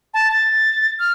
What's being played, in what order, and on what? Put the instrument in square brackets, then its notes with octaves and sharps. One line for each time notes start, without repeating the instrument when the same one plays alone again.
[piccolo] A5
A6
F6